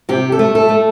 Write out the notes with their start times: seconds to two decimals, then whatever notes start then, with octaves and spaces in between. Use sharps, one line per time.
0.09 C3 G4
0.32 A4
0.39 A3
0.55 A4
0.69 A3